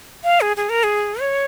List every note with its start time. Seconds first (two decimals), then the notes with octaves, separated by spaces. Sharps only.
0.24 F5
0.41 G#4
0.57 G#4
0.69 A#4
0.83 G#4
1.21 C#5